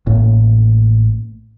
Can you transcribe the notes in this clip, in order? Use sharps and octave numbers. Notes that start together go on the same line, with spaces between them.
A1 A2 A3 A#3